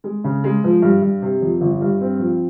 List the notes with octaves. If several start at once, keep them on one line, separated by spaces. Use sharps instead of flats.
G#3
C#3
G#3
F3
G2
G2
C3
F2
G1
G2
C4
F3